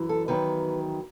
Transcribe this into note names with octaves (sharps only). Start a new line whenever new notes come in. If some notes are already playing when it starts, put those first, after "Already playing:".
Already playing: F#2 E3
A4
E2 D#3 F#3 B4